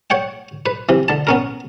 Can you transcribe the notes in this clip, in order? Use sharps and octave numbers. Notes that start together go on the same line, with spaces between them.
C#5 F#5 G5
B4
C3 E3
D3 A5
B3 C#4 A#4